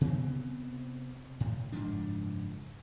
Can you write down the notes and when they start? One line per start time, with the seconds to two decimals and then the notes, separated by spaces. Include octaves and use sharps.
0.01 C3 B3 C4
1.40 A2
1.72 F#1 G#2 F3 D4